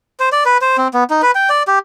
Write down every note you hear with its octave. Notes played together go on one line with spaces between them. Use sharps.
C5
D5
B4
C5
C4
B3
D#4
B4
G5
D5
G4